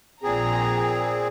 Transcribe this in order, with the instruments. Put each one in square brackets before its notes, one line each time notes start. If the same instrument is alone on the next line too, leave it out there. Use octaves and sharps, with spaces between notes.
[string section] A#1 A#5 [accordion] A#2 C4 G#4